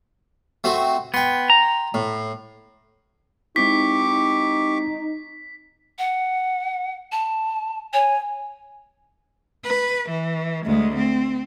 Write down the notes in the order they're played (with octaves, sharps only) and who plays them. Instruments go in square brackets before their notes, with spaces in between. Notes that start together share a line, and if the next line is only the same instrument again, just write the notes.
[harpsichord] A3 C4 F#4
[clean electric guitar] B3 [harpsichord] G5 C6
[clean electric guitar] A#5
[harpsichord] A2
[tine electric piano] G#3 C4 E4 [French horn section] D#4 [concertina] G4 C#6 D6 [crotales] B6
[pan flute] F#5
A5
[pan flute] C#5 [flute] G#5
[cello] B4
E3
D2 G#3
C4